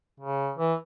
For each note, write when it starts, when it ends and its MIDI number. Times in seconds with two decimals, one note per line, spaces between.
0.20 0.51 49
0.57 0.74 52